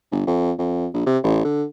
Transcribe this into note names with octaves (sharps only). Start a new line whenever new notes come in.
G1
F2
F2
A#1
C3
A1
D3